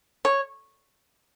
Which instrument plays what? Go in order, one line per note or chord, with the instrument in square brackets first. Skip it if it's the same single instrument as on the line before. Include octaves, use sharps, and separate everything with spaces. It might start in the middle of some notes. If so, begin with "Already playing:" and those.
[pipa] C#5